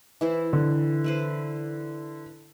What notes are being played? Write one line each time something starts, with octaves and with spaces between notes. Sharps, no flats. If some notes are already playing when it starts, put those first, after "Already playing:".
E3 E4 C5
D3
E4 B4 C5